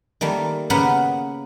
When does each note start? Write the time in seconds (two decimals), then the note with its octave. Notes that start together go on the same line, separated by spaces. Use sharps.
0.21 D#3 G3 A3 A#3
0.70 C#3 A#3 B3 A#4 B4 F#5